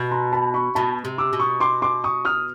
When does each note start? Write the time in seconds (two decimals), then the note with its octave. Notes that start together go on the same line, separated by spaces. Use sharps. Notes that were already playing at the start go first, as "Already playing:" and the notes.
Already playing: B2
0.11 A#5 C6
0.32 A5 B5
0.54 B5 C#6
0.75 B2 A5 B5
1.05 C3
1.18 D6 E6
1.33 B2
1.40 C#6 D#6
1.60 C6 D6
1.82 C6 D6
2.04 C#6 D#6
2.25 D#6 F6